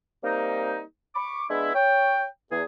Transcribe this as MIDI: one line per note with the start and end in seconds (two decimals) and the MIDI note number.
0.24 0.80 55
0.24 0.80 58
0.24 0.80 60
0.24 0.80 63
1.16 1.43 83
1.16 1.43 85
1.16 1.43 86
1.50 1.72 56
1.50 1.72 59
1.50 1.72 62
1.50 1.72 64
1.74 2.25 73
1.74 2.25 79
2.51 2.62 40
2.51 2.62 68